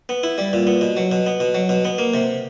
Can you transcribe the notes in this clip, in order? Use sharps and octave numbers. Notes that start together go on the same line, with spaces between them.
B3
E4
G3
A#2
B3
B2
F#3
B2
B3
B2
F#3
B2
B3
A#3
C3